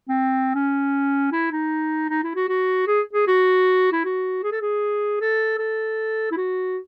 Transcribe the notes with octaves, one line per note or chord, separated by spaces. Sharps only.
C4
C#4
E4
D#4
D#4
E4
F#4
F#4
G#4
G#4
F#4
E4
F#4
G#4
A4
G#4
A4
A4
E4
F#4